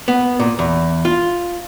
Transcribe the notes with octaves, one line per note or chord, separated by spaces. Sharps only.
B3
A#2
E2
F4